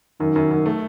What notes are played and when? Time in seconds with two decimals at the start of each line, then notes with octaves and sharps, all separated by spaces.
0.20 F#2 D#3
0.36 F#2
0.51 F#2
0.66 A3